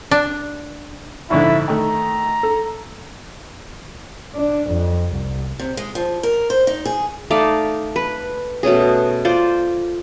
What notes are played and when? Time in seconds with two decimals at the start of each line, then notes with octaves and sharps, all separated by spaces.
0.11 D4
1.30 A#1 G#2 D3 E4
1.68 D#3 A3 A#5
2.43 A4
4.36 D4
4.71 F2
5.15 C2
5.60 C3
5.77 G#3
5.95 F3
6.23 A#4
6.50 C5
6.67 D#4
6.85 G#4
7.30 A3 D#4 D5 F5
7.96 B4
8.63 B2 A3 C#4 G#4
9.25 F4 C5 D5